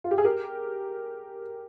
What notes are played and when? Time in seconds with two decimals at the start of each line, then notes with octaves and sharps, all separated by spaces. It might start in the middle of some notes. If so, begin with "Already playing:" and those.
0.04 F4
0.11 G4
0.18 G#4
0.24 G4 A#4